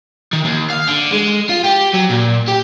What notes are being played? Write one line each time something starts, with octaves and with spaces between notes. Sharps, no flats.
D#3
D#2
F5
D3
G#3
F4
G4
F#3
A#2
G4